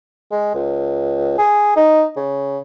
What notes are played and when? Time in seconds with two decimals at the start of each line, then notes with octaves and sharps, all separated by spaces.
0.32 G#3
0.55 C#2
1.38 G#4
1.76 D#4
2.16 C#3